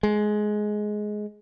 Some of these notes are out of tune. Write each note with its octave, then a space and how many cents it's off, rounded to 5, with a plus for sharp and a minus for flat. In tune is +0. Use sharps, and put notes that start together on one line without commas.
G#3 +15